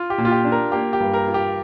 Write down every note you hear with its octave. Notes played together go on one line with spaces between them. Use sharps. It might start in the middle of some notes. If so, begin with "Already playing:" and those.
Already playing: F4
G4
A#2
F4
G4
D4
A#4
A#3 G4
G4
G2
A#4
F4
G4